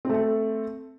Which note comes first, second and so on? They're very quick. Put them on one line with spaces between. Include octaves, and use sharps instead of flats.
C4 A3 A4